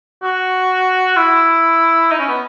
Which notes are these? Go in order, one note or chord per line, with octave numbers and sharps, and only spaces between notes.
F#4
E4
D#4
C#4
B3